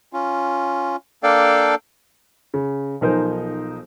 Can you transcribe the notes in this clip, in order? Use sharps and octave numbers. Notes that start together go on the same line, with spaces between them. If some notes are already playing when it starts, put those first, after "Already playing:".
C#4 F4
A#3 D4 A4 D5 F5 G5
C#3
B1 F3 D#4 A#4 C5 G#5